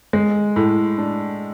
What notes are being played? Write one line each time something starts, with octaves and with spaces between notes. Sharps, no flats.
G#3
A2
D4